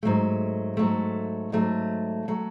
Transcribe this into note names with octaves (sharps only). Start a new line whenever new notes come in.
G#2 F#3 A3
G#2 F#3 A3
G#2 F#3 A3
F#3 A3